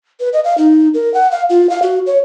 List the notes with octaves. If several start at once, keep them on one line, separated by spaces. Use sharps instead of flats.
B4
D#5
F5
D#4
A#4
F#5
F5
F4
F5
F#4
C#5